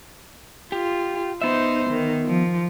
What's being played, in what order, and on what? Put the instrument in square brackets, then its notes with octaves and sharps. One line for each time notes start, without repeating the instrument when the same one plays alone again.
[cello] F4 [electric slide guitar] G4
[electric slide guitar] B3 E5 [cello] D#4 C5
[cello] D#3
F3